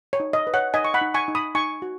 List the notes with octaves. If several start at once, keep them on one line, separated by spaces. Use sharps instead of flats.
C#5
D#4
D#5
B4
C#5 F#5
D#4 D#5 G#5
C#6
F#5 B5
D#4
G#5 C#6
D#4
B5 D#6
D#4 G#5 C#6
F#4